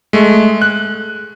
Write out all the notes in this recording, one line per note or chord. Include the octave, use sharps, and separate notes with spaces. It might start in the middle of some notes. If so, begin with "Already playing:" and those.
G#3 A3
F#6